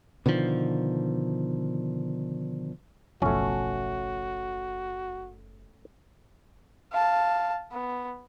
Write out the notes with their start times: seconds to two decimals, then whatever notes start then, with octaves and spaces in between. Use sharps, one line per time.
0.26 B2 D3 D#3 F3
3.22 F#1 B1 B2 F3 A3 C#4 F#4
6.93 F5 A5
7.72 B3